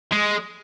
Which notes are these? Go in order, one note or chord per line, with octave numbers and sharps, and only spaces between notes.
G#3